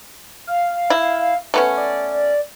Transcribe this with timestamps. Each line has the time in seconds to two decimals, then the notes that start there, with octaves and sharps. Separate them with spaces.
0.47 F5
0.90 E4
1.54 A3 B3 C#4
1.77 D5